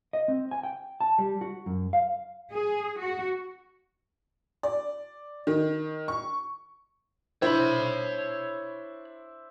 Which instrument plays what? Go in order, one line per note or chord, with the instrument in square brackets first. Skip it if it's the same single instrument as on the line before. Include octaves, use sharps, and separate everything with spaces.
[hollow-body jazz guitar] D#5
C4
G#5
G5
A5
G3
F#4
F#2
F5
[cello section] G#4
F#4
[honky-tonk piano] D5
D#3
C#6
[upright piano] D4 E4 C5 [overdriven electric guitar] C#5 B5